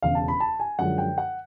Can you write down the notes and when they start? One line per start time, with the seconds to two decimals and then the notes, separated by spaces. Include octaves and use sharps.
0.02 E1 E2 C#3 E3 F5
0.15 A5
0.28 B5
0.40 A5
0.60 G#5
0.79 F#2 D3 F3 G#3 F#5
0.98 G5
1.18 F#5